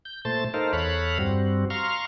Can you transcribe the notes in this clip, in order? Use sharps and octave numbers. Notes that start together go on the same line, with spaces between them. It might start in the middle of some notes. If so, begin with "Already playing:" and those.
G6
A#2 A3 C5 A5 A6
D#4 A4 A#4 C5 F5
E2 A4 C#5 F5 B5 F#6
G2 G3 C4 F#4
F5 A#5 C6 C#6 F6